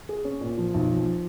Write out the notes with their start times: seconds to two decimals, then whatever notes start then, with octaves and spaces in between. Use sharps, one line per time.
0.09 G#4
0.25 C#4
0.41 A#2
0.58 F3
0.74 B1
0.91 F3